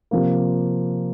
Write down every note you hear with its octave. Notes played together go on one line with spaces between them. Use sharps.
C3 F3 A#3